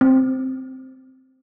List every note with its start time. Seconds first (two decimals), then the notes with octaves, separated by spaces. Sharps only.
0.01 C4